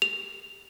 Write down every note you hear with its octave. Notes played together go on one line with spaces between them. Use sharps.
F7